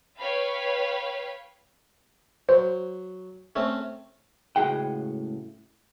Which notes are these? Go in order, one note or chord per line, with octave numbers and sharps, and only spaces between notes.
B4 C#5 F5 G5 B5
F#3 C5
A3 C4 C#4
C#2 A2 F#4 G#4 F#5 G5